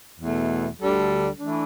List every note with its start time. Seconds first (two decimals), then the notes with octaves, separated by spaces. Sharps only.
0.20 E2 B2 A3
0.80 D2 D3 G3 D4 A4
1.40 E3 A3 D4